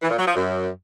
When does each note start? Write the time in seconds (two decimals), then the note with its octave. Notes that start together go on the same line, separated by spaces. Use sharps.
0.02 E3
0.10 A#2
0.19 F#3
0.27 F3
0.35 F#2